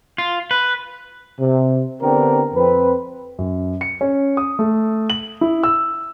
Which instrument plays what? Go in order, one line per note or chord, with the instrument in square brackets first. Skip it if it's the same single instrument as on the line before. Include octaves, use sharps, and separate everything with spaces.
[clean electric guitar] F4
B4
[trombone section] C3
D3 B3 C4 D4 G4 A#4
F2 C4 B4
[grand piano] F#2
C#7
C#4
D#6
A3
F#7
E4
E6